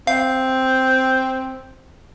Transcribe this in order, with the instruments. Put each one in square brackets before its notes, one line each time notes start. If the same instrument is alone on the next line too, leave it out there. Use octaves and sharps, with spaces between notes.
[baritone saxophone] C4 [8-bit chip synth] F5